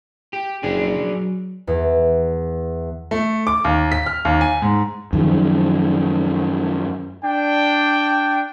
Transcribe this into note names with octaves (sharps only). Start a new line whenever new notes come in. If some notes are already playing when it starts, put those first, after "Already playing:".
G4
F#1 D4 G#4
F#3
E2
A3
D6
D#2
B6
F6
D#2
G#5
G#2
F#2 D#3 F3
D4 G5